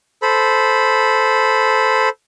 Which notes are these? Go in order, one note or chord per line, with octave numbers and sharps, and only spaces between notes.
A4 C5 B5